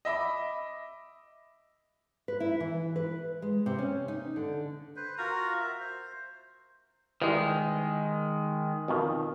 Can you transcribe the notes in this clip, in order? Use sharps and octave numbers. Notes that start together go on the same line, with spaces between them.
D#5 E5 B5 D6
B4
E4
E3
B4
G#3
C3
C#4
D#4
D3
B4 C5
F4 F#4 A#4 A#5
E5
C5
D#3 E3 G3 G#3
F2 B2 D#3